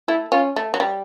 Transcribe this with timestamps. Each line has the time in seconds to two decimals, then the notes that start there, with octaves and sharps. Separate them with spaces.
0.08 A3 E4
0.32 C#4 F4
0.56 A3
0.74 F#3
0.80 G3